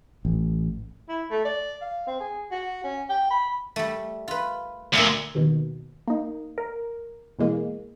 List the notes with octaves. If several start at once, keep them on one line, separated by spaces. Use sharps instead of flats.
A1
E4
A3
D5
F5
C4
G#4
F#4
C#4
G5
B5
G3 A3
F4 B4
D2 A#2 E5 F5
D#2 B2 D#3
A#3 D#4
A#4
B2 E3 G#3 A#3